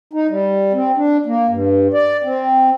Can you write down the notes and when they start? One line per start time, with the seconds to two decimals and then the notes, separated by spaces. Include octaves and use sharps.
0.13 D#4
0.29 G3
0.73 C4
0.97 D4
1.26 A#3
1.49 G2
1.93 D5
2.24 C4